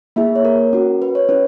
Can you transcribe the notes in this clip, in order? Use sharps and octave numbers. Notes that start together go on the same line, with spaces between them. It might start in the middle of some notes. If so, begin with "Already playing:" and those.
A#3 E4 G#4 E5
C#5
A#4
C#4 F#4
B4
C#5
C#4 E4 B4